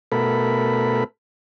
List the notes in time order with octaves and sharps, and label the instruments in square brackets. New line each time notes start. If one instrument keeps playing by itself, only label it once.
[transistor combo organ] B2 A3 A4 A#4 B5